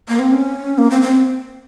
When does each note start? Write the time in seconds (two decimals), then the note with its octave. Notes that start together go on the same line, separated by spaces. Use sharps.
0.08 A#3
0.19 C4
0.32 C#4
0.78 A#3
0.91 C4
1.02 C4